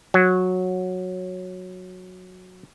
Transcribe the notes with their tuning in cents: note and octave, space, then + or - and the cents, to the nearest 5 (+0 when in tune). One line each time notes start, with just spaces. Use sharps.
F#3 -10